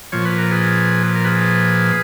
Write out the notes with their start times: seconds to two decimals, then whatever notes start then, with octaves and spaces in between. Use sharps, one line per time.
0.12 A#2 F3 C#5
0.25 B4
0.39 A#4
0.51 G#4 B4
1.15 A#4
1.25 G#4 B4